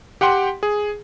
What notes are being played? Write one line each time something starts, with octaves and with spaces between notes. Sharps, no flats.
G4 F#5 G5 C6
G#4